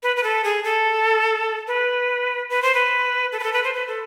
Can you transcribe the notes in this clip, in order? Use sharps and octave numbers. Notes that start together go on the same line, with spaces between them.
B4
B4
A4
G#4
A4
B4
B4
C5
B4
A4
B4
A4
B4
C5
B4
A4